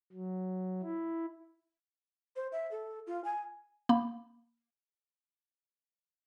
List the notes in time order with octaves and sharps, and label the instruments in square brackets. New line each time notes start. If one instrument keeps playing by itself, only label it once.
[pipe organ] F#3
E4
[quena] C5
E5
A4
F4
G#5
[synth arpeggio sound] A#3 B5